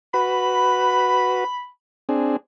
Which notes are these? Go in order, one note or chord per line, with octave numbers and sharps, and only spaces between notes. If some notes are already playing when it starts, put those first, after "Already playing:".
F#4 B4 B5
C4 D4 G#4